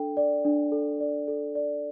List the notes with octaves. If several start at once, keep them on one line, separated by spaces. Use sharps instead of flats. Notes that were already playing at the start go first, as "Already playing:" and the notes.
Already playing: D4 A4 G5
D5
D4
A4
D5
A4
D5